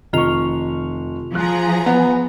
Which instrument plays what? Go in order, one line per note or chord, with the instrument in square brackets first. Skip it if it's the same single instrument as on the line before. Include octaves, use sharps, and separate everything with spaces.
[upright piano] F1 C#6 [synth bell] D#3 F4 F7
[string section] F3 G#4 A#5 [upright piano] F#6
[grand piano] B3